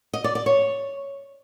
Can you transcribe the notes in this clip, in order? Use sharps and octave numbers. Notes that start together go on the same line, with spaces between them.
D#5
D5
D5
C#5